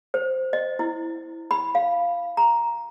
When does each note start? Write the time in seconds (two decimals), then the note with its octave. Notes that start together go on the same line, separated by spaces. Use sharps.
0.14 C5
0.53 D#5
0.79 E4
1.51 B5
1.75 F5
2.37 A#5